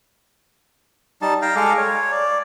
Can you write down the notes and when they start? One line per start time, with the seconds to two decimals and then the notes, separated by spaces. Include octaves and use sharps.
1.22 G3 D#4 A5
1.42 F5 G5 A#5
1.56 G#3 A4 F5 D6
1.77 C#5
2.12 D5